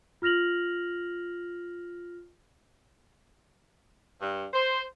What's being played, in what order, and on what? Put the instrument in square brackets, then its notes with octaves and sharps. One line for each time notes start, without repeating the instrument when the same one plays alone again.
[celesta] F4 F6 A#6 F7 F#7
[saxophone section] G2
C5